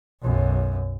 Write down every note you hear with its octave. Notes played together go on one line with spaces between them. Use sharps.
B1 F#2